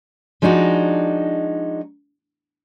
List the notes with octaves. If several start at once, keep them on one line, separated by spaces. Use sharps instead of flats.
F3 G#3 D4 D#4 F#4